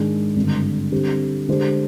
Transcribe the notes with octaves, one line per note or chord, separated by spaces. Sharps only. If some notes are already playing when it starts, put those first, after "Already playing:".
Already playing: G#2 D#3 G#3 D4 G#4
G#1 G2 D3
D3 G3 C4 G4
D3 G#3 D4 G4 C5